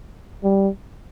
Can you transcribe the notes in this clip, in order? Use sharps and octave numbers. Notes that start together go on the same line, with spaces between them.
G3